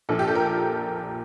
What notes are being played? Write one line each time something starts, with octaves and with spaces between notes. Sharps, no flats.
A#1 A#2 F3 A4
G4
A4
A#4